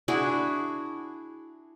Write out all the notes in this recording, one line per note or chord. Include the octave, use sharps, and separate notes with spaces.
D4 E4 F#4 G#4